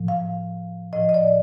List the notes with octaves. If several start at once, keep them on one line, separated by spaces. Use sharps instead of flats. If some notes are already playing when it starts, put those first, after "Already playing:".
Already playing: A2 F3
F5
A2 F3 D#5
D#5
D5